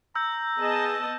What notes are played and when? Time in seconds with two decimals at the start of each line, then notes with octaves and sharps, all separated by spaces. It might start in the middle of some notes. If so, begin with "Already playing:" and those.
0.15 A#5 E6 G6
0.59 B3 G#4 D#5 A5